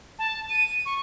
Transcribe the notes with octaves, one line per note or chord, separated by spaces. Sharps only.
A5
D#7
C#6